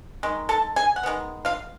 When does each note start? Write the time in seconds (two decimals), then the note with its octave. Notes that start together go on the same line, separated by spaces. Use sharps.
0.23 D#3 G#3
0.49 A4 A5
0.76 G#4 G#5
0.96 F#5
1.03 D#3 G#3 B3
1.45 F4 F5